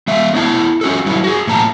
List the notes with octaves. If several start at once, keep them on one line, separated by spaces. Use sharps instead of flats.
G#3 E5 F5
B3 D4 E4 A5
C#4 F#4 A4
F#3 G3 E4
F#4 G#4
A2 A#3 A5 A#5